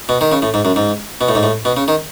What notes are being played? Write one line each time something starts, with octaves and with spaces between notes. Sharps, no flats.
B2
D#3
C#3
A2
G#2
F#2
G#2
B2
A2
G#2
A2
B2
C#3
D#3